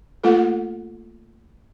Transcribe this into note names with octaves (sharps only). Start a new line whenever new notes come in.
A3 A#3 F4 A4